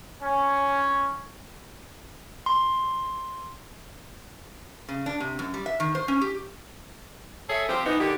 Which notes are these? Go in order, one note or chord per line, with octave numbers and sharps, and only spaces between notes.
C#4
C6
C#3
D4
C3
F#2
G3
E5
D#3
C5
C#4
G4
G#4 A4 C#5 E5
F3 C4 G4
E3 B3 D#4
D3 D#3 G4